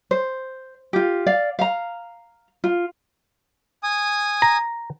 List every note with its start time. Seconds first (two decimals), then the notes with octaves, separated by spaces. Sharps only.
0.11 C5
0.93 F4 G4
1.26 D5 F5
1.59 F5 A#5
2.64 F4
3.83 G#5 D#6
4.42 A#5